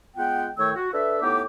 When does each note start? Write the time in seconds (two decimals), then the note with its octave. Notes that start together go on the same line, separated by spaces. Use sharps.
0.16 G#3 B3 F4 F#5 G5
0.58 A2 D#3 A3 C#5 G5 E6
0.75 F#4
0.92 D4 A4 B4 E5
1.22 A2 B3 D#4 G4 D6